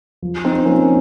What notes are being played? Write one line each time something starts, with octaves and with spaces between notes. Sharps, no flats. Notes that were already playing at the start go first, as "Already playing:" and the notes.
F3
C4 D#4
F3 A#3 C#4